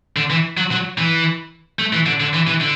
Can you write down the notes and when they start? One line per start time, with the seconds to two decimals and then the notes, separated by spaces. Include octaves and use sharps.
0.17 D3
0.30 E3
0.57 F#3
0.71 F#3
0.98 E3
1.79 A3
1.93 E3
2.06 D3
2.20 D3
2.34 E3
2.47 E3
2.61 D3